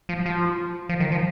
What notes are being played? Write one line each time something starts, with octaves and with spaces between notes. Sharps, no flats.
F3
F3
F3
D#3
F3